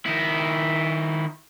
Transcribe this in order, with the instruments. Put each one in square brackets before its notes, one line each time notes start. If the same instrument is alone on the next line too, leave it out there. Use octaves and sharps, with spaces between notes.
[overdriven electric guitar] D#3 E4